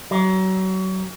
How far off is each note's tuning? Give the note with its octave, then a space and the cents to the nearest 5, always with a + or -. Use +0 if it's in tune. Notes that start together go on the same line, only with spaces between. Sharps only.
F#3 +30